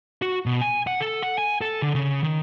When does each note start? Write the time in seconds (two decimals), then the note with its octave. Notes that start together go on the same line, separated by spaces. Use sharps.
0.22 F#4
0.46 B2
0.61 G#5
0.87 F#5
1.01 A4
1.23 F#5
1.38 G#5
1.61 A4
1.82 D3
1.95 C#3
2.23 D#3